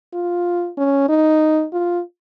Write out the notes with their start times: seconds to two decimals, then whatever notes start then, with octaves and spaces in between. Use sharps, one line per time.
0.13 F4
0.77 C#4
1.08 D#4
1.73 F4